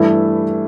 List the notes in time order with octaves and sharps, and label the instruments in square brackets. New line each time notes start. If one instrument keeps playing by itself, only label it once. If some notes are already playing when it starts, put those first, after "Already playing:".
Already playing: [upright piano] G2 E3 A3 E4